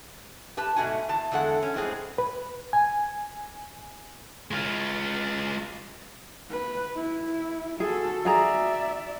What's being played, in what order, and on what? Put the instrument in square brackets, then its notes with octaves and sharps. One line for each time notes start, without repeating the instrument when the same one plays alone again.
[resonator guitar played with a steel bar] G4 B4 A5
G#2 B2 A3 F#4 G#5
E2 A5
E2 D3 G#3 A4 F#5
C#4
F2 A2 G#3 C4 G#4
[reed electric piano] B4
G#5
[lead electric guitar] G#3 F4
[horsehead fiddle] B4
E4
[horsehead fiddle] F#4 A4 [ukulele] G#4
[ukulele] F#4 G#4 A#5 [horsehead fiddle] D5 E5